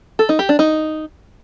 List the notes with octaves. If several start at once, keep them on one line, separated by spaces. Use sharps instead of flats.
A4
D#4
G4
D4
D#4